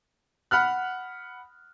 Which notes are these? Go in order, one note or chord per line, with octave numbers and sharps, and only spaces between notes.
F#5 B5 F6 F#6